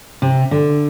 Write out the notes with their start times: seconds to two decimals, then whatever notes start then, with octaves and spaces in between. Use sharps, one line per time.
0.22 C3
0.51 D3